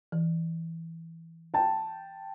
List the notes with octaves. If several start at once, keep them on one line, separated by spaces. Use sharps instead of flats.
E3
G5 A5